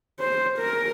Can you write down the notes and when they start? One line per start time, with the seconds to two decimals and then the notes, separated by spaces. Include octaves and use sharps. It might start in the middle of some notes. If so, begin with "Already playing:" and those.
0.20 C5
0.59 A#4